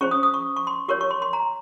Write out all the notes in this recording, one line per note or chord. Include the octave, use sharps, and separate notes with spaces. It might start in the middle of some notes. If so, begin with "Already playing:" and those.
C#4 G#4 C5 C#6
D#6
D#6
C#6
C#6
C6
G4 A#4 C#5 C#6
C#6
C6
C6
A#5